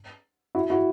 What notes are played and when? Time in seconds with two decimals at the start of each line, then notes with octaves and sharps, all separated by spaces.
0.55 E4 F#4
0.70 E4 F#4